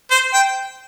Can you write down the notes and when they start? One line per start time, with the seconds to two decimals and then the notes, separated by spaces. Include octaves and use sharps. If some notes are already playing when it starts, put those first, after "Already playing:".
0.11 C5
0.33 G5